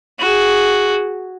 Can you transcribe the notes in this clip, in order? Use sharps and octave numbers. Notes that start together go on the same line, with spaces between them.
F#4 G#4